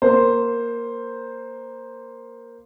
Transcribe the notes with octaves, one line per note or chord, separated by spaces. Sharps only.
A#3 C5